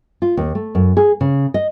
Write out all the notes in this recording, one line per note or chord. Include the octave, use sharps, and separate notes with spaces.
F4
D#2
A3
F#2
G#4
C#3
D#5